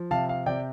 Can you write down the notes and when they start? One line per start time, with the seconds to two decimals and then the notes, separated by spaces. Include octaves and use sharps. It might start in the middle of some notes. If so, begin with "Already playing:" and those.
Already playing: F3
0.11 C3 F5 A5
0.29 F5
0.46 C3 D5 G5